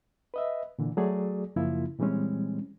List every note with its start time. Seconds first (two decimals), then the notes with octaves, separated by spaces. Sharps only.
0.34 B4 D#5 E5
0.79 A#2 D3 E3
0.97 F#3 A3 F#4 G#4 D5
1.56 F#2 C#3 F3 A#3 E4 F4
1.99 A#2 E3 G3 G#3 C4 C#4